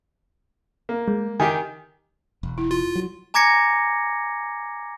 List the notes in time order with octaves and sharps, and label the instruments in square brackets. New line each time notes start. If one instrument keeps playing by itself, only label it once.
[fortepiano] A#3
[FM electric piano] G#3
[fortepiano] D#3 D#4 G4 [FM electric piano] G#5
[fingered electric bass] E1
[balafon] E4
[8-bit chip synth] F4
[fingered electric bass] F#3
[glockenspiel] G#5 A#5 D6 G#6 A#6 C#7